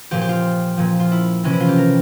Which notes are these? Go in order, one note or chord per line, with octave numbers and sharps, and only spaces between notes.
A#2 F3 G4
G4
F4
A#2 F3
F4
E4
C3 E3 C#4
E4
F4
G4
A#4